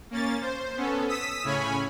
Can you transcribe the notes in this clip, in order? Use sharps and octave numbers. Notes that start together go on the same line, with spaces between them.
A#3 C#4 A6
C5
B3 C#4 A4
D#6 E6 B6
A2 C#3 C#4 C#5 G#5 B5